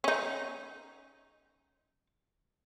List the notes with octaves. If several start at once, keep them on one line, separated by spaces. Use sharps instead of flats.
C#4 D#4